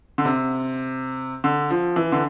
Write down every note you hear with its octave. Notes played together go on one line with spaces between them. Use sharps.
D3
C3
D3
F3
E3
D3